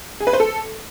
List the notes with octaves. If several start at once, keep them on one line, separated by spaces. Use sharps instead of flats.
G#4
B4
C5
A4